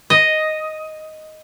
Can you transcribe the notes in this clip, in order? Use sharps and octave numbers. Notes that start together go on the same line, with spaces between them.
D#5